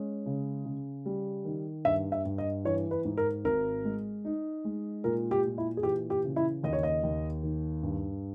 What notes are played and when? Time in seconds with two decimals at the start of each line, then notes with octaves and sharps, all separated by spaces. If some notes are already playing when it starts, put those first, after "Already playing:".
Already playing: G#3 C#4
0.26 C#3
0.65 C#3
1.05 G3
1.45 D#3
1.85 G2 E5
2.12 E5
2.25 G2
2.38 D#5
2.65 E3 C#5
2.91 B4
3.05 G#2
3.17 A#4
3.44 G#1 A#4
3.85 G#3
4.25 D#4
4.65 G#3
5.04 A#2 A#4
5.31 G4
5.45 A#2
5.58 E4
5.77 G#4
5.83 E3 G4
6.10 G4
6.24 C#3
6.36 E4
6.63 D#2 D#5
6.73 C#5
6.83 D#5
7.03 D#2
7.43 D#3
7.83 G2